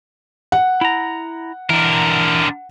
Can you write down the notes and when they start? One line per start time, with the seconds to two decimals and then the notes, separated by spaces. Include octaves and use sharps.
0.52 F#5
0.81 E4 A#5
1.70 D3 E3 A#4